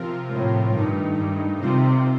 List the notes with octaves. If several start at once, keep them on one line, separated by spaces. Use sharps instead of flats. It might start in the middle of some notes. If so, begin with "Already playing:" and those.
Already playing: C3 F3 C4 F4 A#4
A2
G2 D#3 A3 D#4
G2
C3 D#3 G3 C4 F4 C5